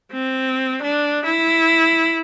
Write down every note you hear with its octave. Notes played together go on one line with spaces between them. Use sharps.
C4
D4
E4